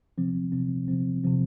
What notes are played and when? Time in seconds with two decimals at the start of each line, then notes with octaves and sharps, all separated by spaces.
0.18 C3 F3 C4
0.52 C3 F3 C4
0.88 C3 F3 C4
1.24 C3 F3 C4